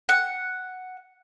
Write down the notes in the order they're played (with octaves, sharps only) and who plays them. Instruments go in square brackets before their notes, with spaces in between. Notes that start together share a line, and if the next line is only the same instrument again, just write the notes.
[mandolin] F#5